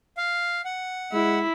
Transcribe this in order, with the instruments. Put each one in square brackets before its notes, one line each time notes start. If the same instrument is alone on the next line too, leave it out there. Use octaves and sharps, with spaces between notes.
[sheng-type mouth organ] F5
F#5
[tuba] G#3 [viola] E4